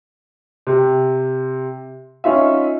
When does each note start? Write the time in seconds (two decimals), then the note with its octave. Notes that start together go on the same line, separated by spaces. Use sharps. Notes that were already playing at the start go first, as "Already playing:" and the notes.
0.67 C3
2.24 C#4 D#4 F4 E5